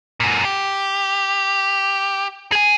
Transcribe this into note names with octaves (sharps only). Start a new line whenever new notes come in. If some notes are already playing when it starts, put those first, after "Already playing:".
F#2 A#2
G4
G#4 G#5